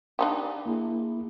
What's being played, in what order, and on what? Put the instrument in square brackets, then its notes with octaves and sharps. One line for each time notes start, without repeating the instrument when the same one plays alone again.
[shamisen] D4 D#4 G4
[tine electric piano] A#3 E4 G#4